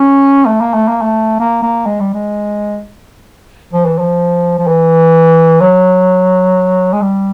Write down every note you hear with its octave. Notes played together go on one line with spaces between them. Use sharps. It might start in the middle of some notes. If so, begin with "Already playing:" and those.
Already playing: C#4
A3
A#3
A3
A#3
A3
A#3
A#3
G#3
G3
G#3
F3
E3
F3
F3
E3
F#3
G#3
G3